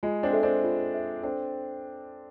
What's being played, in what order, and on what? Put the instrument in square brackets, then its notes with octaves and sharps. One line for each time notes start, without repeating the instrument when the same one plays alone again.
[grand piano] G#3 [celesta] F4
[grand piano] C4 D4
[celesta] A4 C5 E5
[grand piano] C4 D4
[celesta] F4
A4 C5 E5
[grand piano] C4 D4 [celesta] A4